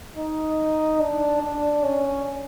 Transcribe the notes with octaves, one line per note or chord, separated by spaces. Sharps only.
D#4
D4
D4
C#4